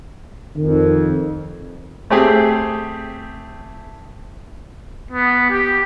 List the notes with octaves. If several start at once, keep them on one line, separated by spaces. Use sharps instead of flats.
F2 D#3
A3 C4 G4 G#4
B3
G4